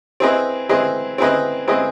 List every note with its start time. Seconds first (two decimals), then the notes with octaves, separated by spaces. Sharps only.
0.20 C4 E4 G#4 B4 D#5
0.69 C4 E4 G#4 B4 D#5
1.18 C4 E4 G#4 B4 D#5
1.68 C4 E4 G#4 B4 D#5